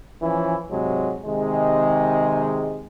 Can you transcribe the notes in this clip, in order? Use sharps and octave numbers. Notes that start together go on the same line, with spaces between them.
E3 F3 C#4 E4
G#2 C3 F#3 G#3
C3 D#3 G#3